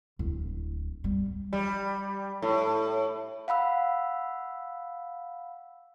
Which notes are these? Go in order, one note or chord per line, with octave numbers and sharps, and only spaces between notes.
D1
G3
G3
A2
F5 F#5 B5 E6